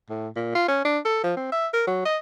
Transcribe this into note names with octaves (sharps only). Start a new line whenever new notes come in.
A2
A#2
F4
C#4
D4
A4
F3
C4
E5
A#4
F#3
D#5